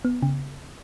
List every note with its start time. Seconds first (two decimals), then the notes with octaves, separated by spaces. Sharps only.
0.05 B3
0.22 C#3